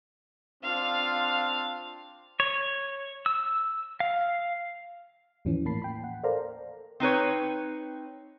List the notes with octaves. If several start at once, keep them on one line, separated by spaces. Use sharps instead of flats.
C4 D4 F4 F5
C#5
E6
F5
D#2 G#2 E3 F3 C#4
A2 A#3 A5 B5 C7
G5 B5
F#5
A4 A#4 C5 D5 F5 A#5
C4 D#4 B4 C#5